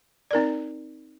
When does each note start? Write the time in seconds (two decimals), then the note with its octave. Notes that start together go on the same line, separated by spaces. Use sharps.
0.31 C4 D#4 A#4 D5